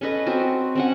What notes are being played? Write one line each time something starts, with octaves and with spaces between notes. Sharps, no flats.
C#4 A4 B4 D#5
C4 F#4 C5
C4 C#4 F#5